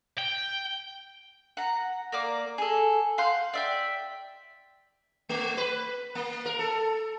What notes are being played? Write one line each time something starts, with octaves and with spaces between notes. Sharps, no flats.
G5
F#5 A#5
A#3 D5 D6
G#4 A4
F5 F#5 C6 G6
D5 E5 G5
A3
B4
A#3
A#4
A4